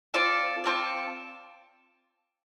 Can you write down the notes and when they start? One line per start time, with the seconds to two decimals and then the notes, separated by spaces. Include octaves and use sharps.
0.14 C4 F4 A4 D5
0.64 C4 F4 A4 D5